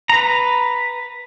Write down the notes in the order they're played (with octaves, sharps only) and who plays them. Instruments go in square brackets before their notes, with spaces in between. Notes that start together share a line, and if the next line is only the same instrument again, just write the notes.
[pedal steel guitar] B4 A#5